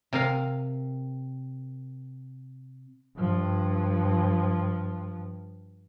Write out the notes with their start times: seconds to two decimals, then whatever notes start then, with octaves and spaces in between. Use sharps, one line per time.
0.13 C3 A#4 F5
3.17 G2 F3